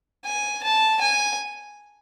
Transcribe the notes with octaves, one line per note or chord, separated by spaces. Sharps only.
G#5
A5
G#5